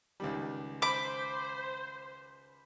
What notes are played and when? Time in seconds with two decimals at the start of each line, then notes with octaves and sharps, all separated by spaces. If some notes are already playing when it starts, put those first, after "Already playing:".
0.20 C#2 D#3 G3
0.82 C5 B5 D6